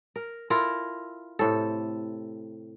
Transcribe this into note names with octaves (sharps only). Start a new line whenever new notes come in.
A#4
E4 F4 A4 A#4
A2 C3 A4